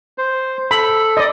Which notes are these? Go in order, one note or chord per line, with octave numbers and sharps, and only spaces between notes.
C5
A4 B5
D5 D#5